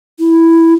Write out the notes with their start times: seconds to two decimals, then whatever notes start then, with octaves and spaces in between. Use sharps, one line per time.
0.19 E4